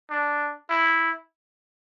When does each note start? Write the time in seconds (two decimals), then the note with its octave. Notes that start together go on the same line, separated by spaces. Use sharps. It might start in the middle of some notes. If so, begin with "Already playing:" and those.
0.10 D4
0.69 E4